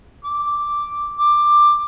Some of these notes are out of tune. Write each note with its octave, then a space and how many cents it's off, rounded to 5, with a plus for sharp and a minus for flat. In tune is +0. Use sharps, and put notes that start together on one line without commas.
D6 +0
D6 +15